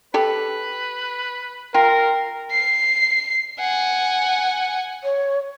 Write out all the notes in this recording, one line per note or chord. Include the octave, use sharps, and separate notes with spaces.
G4 A4 B4
F4 A#4 G5 C6
C7
F#5 G#5
C#5